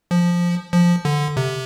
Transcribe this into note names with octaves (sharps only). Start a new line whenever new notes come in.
F3
F3
D3
C3